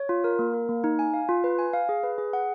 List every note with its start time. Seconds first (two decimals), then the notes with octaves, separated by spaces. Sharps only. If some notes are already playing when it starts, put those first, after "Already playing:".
Already playing: C#5
0.09 F4
0.24 A#4
0.39 A#3
0.54 A#4
0.69 A#3
0.84 D#4
0.99 G#5
1.14 F5
1.29 F4
1.44 B4
1.59 G#5
1.73 F5
1.89 G#4
2.04 B4
2.18 G#4
2.33 F#5